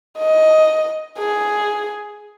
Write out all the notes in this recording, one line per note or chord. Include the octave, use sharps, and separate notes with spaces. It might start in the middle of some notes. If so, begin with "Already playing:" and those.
D#5
G#4